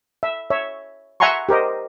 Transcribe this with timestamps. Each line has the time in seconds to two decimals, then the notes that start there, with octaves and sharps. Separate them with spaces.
0.23 E5
0.50 C#5 E5
1.20 E5 F#5 G#5 A#5 C6 C#6
1.49 G4 A#4 C5 D#5